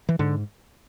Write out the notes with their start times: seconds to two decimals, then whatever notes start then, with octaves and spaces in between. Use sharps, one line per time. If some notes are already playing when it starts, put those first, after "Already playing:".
0.09 E3
0.19 G#2 D3